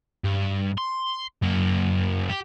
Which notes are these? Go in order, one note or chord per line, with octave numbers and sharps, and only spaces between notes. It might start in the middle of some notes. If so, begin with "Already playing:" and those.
G2
C6
F#2 A#3
G4